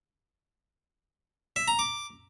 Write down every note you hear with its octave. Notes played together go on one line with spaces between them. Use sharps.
E5
A#5
D6